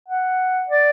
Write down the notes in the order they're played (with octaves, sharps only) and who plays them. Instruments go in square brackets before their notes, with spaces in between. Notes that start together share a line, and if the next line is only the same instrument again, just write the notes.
[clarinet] F#5
D5